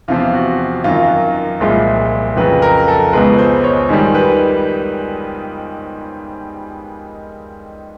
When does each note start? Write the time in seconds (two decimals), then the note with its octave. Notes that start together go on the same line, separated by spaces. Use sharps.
0.08 E2 C3 F3 F4
0.34 F#4
0.84 F#2 D#3 F#3 F4
1.60 C2 A#2 F3 G#3
2.37 F2 C#3 F#3 B4
2.62 A#4
2.88 A4
3.13 C#2 B2 G#3 B4
3.38 C5
3.64 C#5
3.89 G#2 D#3 G3
4.15 B4